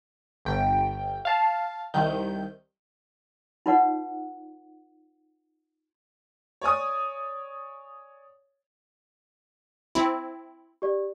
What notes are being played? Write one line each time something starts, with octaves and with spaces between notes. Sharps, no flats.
G1 G5
F5 A5
C2 D#3 G6
D#4 F4 B4 D5 F#5
C#5 D5 G#5 D#6
C4 E4
G4 D5